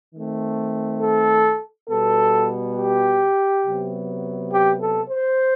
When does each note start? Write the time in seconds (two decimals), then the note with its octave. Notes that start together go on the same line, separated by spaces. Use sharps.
0.15 D#3 A3 C4
1.02 A4
1.90 B2 G3 B3 A4
2.77 G4
3.65 C3 F#3 B3
4.52 G4
4.82 A4
5.10 C5